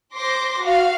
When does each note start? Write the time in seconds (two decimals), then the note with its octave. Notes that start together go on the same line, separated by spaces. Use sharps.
0.14 C5 C6 D6 A#6
0.61 F#4 F5